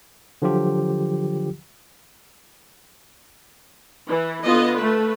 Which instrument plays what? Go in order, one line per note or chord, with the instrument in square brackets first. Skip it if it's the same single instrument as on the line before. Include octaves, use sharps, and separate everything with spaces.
[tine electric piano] D3 F3 F#3 F4 G4
[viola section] E3
D3 B3 F4 D#5
A3 B4